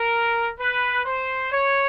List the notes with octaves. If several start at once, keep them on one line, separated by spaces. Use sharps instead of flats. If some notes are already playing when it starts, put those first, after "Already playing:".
Already playing: A#4
B4
C5
C#5